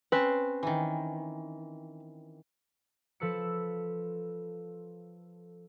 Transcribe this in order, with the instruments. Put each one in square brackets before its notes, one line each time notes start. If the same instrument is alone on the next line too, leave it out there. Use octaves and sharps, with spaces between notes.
[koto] C4 C#4 C5 [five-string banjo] B4
[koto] D#3 E3
[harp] F3 A4 B4 E6 C#7